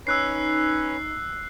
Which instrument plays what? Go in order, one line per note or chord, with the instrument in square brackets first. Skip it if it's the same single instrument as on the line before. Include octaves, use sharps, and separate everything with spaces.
[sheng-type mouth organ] C#4 B4 C#5 [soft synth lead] D#4 [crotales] E6 F#6 C7